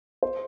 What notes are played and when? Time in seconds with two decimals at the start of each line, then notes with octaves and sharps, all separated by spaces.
0.23 C5